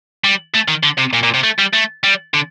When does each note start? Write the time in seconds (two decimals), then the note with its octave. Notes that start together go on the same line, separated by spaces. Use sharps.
0.24 G3
0.54 A3
0.68 D#3
0.83 D3
0.98 C3
1.13 A#2
1.23 A#2
1.34 C3
1.43 A3
1.59 G3
1.73 A3
2.04 G3
2.34 D3